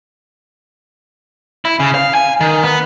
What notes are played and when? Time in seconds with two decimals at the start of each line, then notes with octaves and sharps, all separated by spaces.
1.65 E4
1.80 C#3
1.95 F5
2.15 G#5
2.41 D#3
2.63 B3